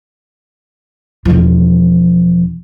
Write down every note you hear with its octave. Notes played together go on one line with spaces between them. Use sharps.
E1 F3